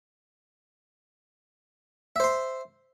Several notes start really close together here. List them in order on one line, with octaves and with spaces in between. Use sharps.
E5 C5 C6